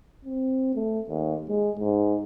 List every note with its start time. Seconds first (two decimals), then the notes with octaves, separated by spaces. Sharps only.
0.25 C4
0.75 A3
1.09 D#2
1.49 G#3
1.79 G#2